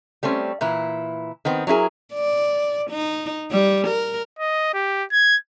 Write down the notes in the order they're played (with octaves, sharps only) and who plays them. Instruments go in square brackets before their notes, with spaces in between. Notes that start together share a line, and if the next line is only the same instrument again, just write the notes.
[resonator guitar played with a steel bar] G3 A3 C4 C#4
A#2 E3 E4
D#3 B3 C4
F#3 D4 E4 G#4 A#4
[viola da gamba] D5
D#4
G3
A#4
[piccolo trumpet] D#5
G4
G#6